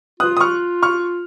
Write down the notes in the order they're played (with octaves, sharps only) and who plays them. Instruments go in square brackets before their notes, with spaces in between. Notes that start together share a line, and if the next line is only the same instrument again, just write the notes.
[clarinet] F4 [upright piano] D#6 F#6
[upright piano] D#6
C#6 F6
C#6 F6